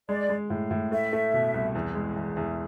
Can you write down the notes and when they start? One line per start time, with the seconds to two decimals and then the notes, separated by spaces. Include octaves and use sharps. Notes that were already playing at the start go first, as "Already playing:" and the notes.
0.09 G#3 D5
0.29 G#3
0.50 A2
0.71 A2
0.92 A3 E5
1.13 A3
1.34 B2
1.54 C2
1.75 E2
1.95 G#3
2.16 E2
2.37 E2